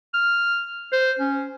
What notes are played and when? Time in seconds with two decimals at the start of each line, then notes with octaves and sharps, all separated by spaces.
0.14 F6
0.93 C5
1.19 C#4